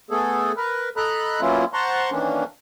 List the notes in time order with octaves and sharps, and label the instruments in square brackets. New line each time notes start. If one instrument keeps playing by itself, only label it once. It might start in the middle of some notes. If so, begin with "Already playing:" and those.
[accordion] A3 B3 G#4 A4
A#4 B4
A4 D#5 A#5 B5 F#6
F#3 A#3 B3 C#4 E4 F4
C5 F#5 A5 A#5 C6 C#6
D#3 E3 A#3 C#4 D4